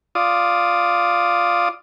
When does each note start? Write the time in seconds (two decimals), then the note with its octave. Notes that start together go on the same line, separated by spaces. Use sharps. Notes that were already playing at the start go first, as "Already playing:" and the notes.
0.15 F4 D5 D#6